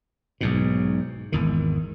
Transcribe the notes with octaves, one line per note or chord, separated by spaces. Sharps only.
B1 G#2 B2
G#1 E2 D#3